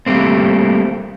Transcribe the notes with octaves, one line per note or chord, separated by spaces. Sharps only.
G3 A3 A#3 C4